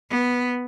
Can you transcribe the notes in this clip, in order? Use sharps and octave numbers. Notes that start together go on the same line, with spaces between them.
B3